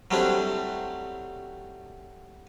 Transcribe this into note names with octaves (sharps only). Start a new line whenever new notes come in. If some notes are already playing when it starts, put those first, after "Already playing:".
F#3 G3 A3 C4 D4 E4